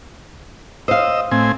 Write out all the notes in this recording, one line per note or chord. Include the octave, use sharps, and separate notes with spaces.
C5 D#5 F5 E6
A2 C4 G#5